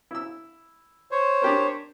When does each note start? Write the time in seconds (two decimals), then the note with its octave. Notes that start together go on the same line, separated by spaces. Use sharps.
0.11 E4 E6
1.11 C5 C#5
1.42 D4 G4 A#4